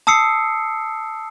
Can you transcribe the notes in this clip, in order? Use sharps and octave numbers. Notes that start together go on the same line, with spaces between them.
A5 D#6 E6 C7 C#7